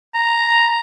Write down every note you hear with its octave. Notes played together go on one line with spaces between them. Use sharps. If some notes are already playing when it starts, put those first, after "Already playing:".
A#5